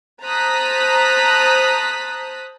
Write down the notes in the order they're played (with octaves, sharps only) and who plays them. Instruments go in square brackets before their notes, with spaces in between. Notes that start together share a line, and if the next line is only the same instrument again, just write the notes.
[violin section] C5 A5 A#5 D#6 F#6 B6